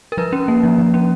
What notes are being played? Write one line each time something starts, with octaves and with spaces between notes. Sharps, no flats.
A#4
F3 B4
C#4
A#3
F3
F3
C#4